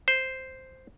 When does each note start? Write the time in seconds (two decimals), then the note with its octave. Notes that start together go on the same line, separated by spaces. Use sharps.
0.08 C5